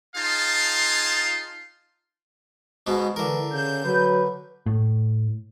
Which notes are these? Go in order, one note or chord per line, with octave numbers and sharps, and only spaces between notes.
D#4 F4 G#4 F5 A5 C6
G#2 B2 B3
D3 E3 A#4
C#3 G6
F#3 B4
A2